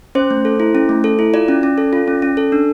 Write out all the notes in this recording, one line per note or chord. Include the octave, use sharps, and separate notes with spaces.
C#4 C5
A3
A4
E4
C#4
A3
A4
E4
F4 D5
C#4
C#4
A4
F4
C#4
C#4
A4
D4